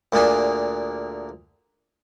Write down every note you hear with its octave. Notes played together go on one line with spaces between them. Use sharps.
D2 A#2 A#3 D4 G#4